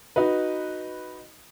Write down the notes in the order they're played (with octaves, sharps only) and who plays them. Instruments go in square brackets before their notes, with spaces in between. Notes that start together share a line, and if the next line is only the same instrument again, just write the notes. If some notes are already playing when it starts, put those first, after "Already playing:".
[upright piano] D#4 F#4 B4